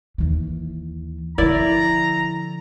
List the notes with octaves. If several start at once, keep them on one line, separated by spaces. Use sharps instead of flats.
D#2 E3
D3 F3 E4 D5 E5 A#5